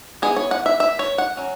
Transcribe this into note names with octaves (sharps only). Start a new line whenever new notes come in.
E3 G#3 B3 G#4
C#5
F#5
E5
E5
C#5
F#5
F#3 C#4